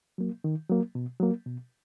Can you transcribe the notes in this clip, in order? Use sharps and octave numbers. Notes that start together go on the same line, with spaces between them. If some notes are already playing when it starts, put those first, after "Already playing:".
F#3 A#3
D#3
F#3 A#3
B2
F#3 A#3
B2